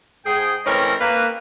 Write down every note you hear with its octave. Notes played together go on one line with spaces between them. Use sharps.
G#2 G#4 G5
E3 A3 C4 C#4 A#4 D#5
A#3 B4